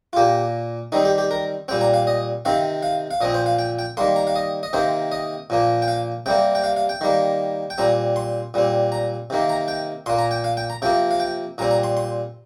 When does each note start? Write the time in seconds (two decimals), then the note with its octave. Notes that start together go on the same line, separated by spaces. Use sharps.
0.13 F4
0.16 A#2 A#3 G4
0.92 D#3 G3 C4 D#4
1.05 G4
1.18 G4
1.31 A#4
1.68 A#2 G3 C4 G5
1.81 A#5
1.94 F5
2.07 D#5
2.45 C3 D#3 C4 F5
2.83 F5
3.11 F5
3.21 A#2 F3 C4 D#5
3.34 C5
3.46 F5
3.59 G5
3.79 G5
3.97 D#3 G3 A#3 C6
4.16 A#5
4.27 F5
4.36 D#5
4.63 D#5
4.73 C3 D#3 A#3 C5
5.12 D#5
5.50 A#2 F3 A#3
5.82 G5
5.88 F5
6.26 C3 G3 A#3 G5
6.55 G5
6.64 F5
6.77 F5
6.89 G5
7.01 D#3 G3 A#3
7.70 G5
7.78 A#2 G3 C4 A#5
8.16 C6
8.54 A#2 G3 C4
8.92 A#5
9.30 C3 D#3 A#3
9.49 A#5
9.68 G5
10.06 A#2 A#3 C6
10.19 A#5
10.31 G5
10.44 F5
10.57 G5
10.70 A#5
10.82 C3 F3 A#3 G5
11.11 F5
11.20 G5
11.58 A#2 G3 C4 A#5
11.71 A#5
11.83 C6
11.97 C6